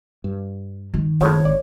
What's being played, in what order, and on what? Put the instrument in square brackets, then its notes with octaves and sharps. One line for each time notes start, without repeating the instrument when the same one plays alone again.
[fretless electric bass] G2
[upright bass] D#3
[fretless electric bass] F#1 C#2 [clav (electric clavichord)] A2 C#3 F3 [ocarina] C#5
[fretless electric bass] G#1 [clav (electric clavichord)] D5